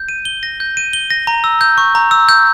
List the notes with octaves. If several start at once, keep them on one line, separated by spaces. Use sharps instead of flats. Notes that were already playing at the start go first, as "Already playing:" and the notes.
Already playing: G6
D#7
G7
A#6
G6
D#7
G7
A#6
A#5
E6
G6
C#6
A#5
E6
G6